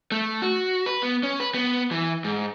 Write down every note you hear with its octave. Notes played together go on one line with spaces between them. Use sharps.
A3
F#4
B4
B3
C#4
B4
B3
E3
G#2